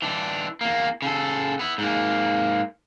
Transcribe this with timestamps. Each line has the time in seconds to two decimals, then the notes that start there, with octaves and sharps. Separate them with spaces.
0.02 E3 D4
0.61 E2 A#3
1.02 C#3 A4
1.59 B3 E4
1.78 G#2 A#3